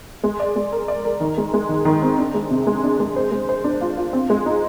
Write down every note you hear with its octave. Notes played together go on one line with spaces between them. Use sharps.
G#3
D5
G#3
A#4
D5
A#4
D#3
G#3
G#3
D#3
D#3
C4
D4
G#3
C3
G#3
D4
G#3
C5
G#3
C5
D4
F4
F4
C4
G#3
D#4